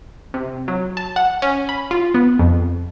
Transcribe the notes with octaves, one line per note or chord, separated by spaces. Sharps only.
C3
F#3
A5
F#5
C#4
B5
F4
B3
F2